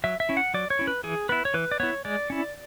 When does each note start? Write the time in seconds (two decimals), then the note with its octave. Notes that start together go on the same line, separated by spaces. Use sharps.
0.04 F#3 E5
0.20 E5
0.29 C#4 E4
0.37 F#5
0.54 F#3 D5
0.70 C#5
0.79 C#4 E4
0.87 B4
1.03 E3 G#4
1.29 B3 E4 B4
1.45 C#5
1.54 E3 B4
1.71 D5
1.80 B3 E4 C#5
2.05 G#3 D5
2.30 C#4 E4